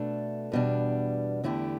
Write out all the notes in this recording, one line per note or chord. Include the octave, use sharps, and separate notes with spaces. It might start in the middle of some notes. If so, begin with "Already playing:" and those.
Already playing: B2 A3 D4 A4
E2 B2 G3 D4
E2 D3 A3 E4 G4